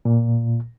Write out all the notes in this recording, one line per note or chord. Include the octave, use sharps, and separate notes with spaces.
A#2